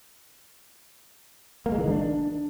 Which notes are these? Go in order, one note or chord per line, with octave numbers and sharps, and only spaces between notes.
A#3
G#3
E3
D#3
D4